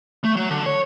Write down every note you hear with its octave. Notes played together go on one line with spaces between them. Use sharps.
A3
F#3
D3
C#5